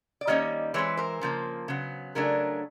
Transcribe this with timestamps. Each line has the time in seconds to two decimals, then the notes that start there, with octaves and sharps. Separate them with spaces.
0.21 D5
0.27 D#3 G3 A#3 C#4 C#5 D#5
0.74 E3 G#3 C4 B4 C#5
0.97 A#4 C5
1.21 C#3 F3 A#3
1.68 C#3 F#3 B3
2.15 C#3 F#3 A3 D4 G#4 A#4